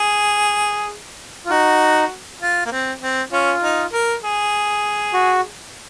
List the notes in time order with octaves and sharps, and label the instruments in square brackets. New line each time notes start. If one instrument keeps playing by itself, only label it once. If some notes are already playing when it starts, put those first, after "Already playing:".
Already playing: [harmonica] G#4
[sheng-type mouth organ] F4
[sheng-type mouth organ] D#4 [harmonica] F#4
[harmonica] F4
A#3
C4
C4
[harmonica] C#4 [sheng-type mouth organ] F4
[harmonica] D#4
A#4
G#4
[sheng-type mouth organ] F#4